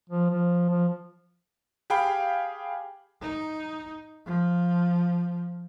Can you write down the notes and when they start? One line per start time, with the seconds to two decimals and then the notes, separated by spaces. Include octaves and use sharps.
0.09 F3
0.30 F3
0.70 F3
1.90 G4 G#4 F5 G5 B5
3.22 D#4
4.26 F3